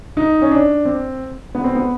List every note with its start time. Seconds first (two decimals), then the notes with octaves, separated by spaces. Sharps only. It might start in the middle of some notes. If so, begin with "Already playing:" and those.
0.17 D#4
0.42 C#4
0.51 D4
0.85 C4
1.55 B3
1.64 C4
1.75 B3